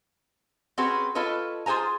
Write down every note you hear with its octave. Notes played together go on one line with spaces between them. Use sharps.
C4 C#4 F#4 G#4 B4
F4 A4 B4 C#5 D#5
F4 G#4 C5 G#5 A#5